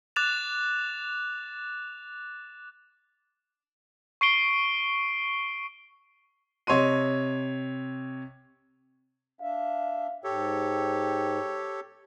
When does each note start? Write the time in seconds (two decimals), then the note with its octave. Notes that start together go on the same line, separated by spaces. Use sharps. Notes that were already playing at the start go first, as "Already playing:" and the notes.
0.16 D6 F#6 A6 E7 F7
4.21 C#6 C7 D7 G7
6.67 C3 C#5 D#5 C6 D#7
9.41 D4 E5 F5
10.24 G#2 G4 A4 C#5 G5